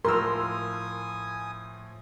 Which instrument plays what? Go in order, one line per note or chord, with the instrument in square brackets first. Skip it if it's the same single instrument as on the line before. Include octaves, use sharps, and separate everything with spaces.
[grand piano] A2 F3 [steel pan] A#4 [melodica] G#5 D#6 [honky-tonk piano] C6 E6